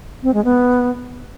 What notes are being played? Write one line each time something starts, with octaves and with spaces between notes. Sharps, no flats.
C4
G#3
B3